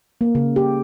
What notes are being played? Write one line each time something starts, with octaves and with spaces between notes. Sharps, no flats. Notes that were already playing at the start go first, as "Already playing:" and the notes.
A#3
C#3
G4